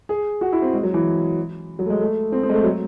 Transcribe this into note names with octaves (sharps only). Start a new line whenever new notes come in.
G#4
F#4
E4
C4
G#3
F#3
E3
F#3
A3
G#3
A3
C4
C4
G#3
A3
F#3